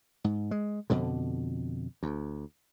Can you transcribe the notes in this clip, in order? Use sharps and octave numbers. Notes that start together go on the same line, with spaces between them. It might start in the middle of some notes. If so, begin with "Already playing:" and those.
G#2
G#3
F2 B2 D3
D2